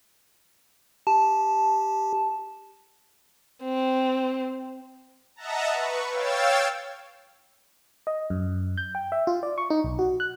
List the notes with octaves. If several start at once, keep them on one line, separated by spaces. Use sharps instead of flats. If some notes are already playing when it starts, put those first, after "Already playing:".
G4 A5
C4
D#5 E5 F#5 A5 A#5
B4 C#6
C#5 F5 G5 E6 A6
D#5
F#2
G6
G5
E5
F4
D5
C#6
D#4
B1
F#4
F#6